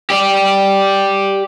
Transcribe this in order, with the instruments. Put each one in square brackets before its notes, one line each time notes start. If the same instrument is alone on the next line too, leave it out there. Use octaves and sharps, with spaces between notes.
[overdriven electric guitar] G4 D5